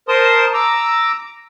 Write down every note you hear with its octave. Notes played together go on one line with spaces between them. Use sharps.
A#4 C5 A5 C6 D#6
A#5 D6 E6